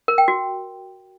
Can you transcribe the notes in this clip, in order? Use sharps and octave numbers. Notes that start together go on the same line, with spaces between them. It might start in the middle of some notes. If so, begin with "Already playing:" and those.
A#4
G5
F#4